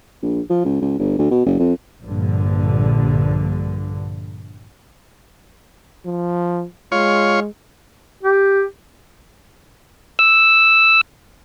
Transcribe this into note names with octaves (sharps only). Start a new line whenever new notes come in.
A#1
F3
C#2
C#2
G1
D2
B2
F#1
F2
A#1 G2 D3
F3
G#3 F4 C#5
G4
E6